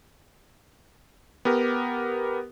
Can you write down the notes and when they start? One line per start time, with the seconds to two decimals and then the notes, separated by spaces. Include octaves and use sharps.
1.45 B3 G4 A#4